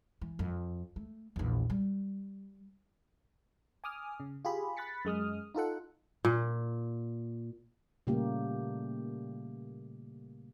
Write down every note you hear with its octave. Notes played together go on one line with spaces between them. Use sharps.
E3
F2
A3
A#1 E2
G3
G#5 D6 D#6 F6
C#3
F4 G4 G#4 B5
B5 F#6 A6 B6 C#7
F#2 G#3 D#6 F6
D#4 F4 A4 F#5
A#2
A#2 C#3 G3 A3 A#3 G4